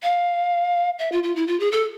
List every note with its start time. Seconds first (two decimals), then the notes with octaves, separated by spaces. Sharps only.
0.03 F5
0.99 E5
1.12 F4
1.23 F4
1.36 E4
1.47 F4
1.60 G#4
1.72 A4